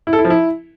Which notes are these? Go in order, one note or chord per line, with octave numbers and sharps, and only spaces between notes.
E4
A4
E4
F3
E4